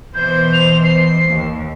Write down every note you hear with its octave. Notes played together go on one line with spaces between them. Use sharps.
B2 E3 C5 G6
F7
C7
D#2